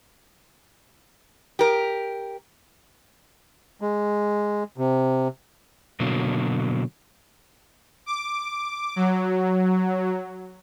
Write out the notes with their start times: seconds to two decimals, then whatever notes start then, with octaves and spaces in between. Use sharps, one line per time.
1.59 G4 A#4
3.81 G#3
4.78 C3
6.00 B2 D3 F#3 A#3
8.06 D6
8.96 F#3